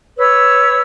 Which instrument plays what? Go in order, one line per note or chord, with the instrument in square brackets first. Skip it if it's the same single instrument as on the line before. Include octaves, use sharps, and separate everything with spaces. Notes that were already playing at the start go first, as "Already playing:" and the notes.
[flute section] B4 C#5 E6